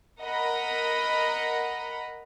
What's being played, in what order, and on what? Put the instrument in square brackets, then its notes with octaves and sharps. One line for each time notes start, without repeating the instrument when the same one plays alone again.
[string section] A#4 D#5 F#5 A#5 B5